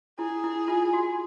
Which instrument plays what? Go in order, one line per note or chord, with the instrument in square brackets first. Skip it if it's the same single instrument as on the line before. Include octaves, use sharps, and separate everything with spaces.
[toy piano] E4 [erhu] G#4
[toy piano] E4
F4
F#4